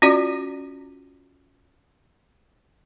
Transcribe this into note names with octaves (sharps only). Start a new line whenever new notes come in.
C#4 F4 F#4 D5